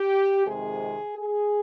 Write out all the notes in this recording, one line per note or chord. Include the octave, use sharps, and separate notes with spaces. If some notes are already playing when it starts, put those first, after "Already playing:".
Already playing: G4
F2 C3 D#3 G#3 G#4
G#4